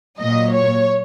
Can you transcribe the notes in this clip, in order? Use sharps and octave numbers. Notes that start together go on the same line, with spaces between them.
A#2 F#3 D#5
C#5